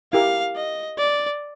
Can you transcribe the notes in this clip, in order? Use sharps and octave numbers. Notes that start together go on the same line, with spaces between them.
E4 G4 A#4 F5
D#5
D5